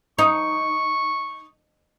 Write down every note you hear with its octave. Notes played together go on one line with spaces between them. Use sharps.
D#4 C#6